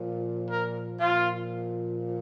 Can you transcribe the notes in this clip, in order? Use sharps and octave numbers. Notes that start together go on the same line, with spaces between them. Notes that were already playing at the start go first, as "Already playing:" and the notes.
Already playing: A#2 F3
A#4
A#2 F3 F4